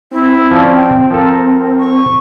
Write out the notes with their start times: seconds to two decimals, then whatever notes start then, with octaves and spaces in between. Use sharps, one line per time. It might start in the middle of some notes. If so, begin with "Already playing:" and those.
0.11 C4 E4
0.51 F3 C#4 D5
0.74 G5
1.11 F3 A4 A#4
1.78 C#6